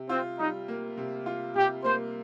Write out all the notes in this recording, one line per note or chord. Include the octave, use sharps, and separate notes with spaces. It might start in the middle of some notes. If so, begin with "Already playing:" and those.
Already playing: C3
C4 F4
G3 D#4
A#3
C3
F4
C3 G4
A#3 C5